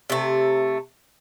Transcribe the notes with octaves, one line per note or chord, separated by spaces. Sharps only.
C3 A3